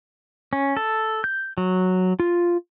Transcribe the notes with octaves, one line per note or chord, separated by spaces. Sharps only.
C#4
A4
G6
F#3
F4